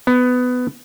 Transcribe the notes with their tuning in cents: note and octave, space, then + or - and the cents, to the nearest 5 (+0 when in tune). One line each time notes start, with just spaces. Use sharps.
B3 +15